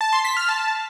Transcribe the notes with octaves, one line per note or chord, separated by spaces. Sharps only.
A5
C6
B6
F6
A5